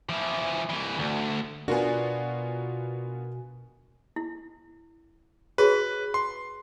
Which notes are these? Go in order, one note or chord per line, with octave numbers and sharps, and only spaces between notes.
E3 F3
C2 E3
D2
B2 B3 D4 F4 F#4 A#4 G#5
E4
F#4 G#4 B4 C#5
C6